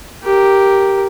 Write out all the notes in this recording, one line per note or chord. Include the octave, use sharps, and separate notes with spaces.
G4 A#4